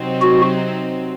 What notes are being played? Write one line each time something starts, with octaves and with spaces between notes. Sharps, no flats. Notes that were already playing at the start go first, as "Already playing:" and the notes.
Already playing: C3 F#3 C4 D#4
F#4